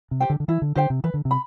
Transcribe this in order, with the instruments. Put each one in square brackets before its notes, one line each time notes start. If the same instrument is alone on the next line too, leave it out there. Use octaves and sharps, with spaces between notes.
[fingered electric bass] C3
[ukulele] G4 C5 G5
[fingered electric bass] D3
D3
[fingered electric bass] E3 [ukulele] E4
[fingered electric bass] D3
[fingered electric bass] D3 [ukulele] G4 C5 G5
[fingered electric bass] C3
[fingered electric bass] E3 [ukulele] B4
[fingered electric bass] D3
C3
[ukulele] B5